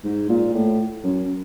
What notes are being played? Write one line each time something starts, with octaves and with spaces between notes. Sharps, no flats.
G#2
A#2
A2
F#2